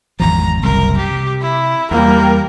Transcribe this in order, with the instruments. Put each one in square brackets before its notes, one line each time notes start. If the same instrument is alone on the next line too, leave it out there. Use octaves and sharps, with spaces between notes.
[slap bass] G#1 E2 F3 [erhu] A#5
[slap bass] F#1 C2 [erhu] A#4
[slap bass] C3 [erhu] G4
[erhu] E4
[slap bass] E2 [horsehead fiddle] G3 A#3 [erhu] A#4